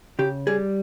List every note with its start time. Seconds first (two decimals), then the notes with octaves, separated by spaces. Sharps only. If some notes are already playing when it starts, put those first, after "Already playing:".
0.19 C#3 G4
0.47 G3 G#4